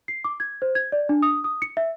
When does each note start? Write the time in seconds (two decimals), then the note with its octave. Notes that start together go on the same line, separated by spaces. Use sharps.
0.08 C7
0.24 D6
0.40 G#6
0.62 C5
0.75 G#6
0.92 D5
1.09 D4
1.22 D#6
1.44 D#6
1.62 C#7
1.77 E5